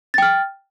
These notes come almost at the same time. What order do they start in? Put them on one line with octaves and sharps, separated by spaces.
A6 G5 F6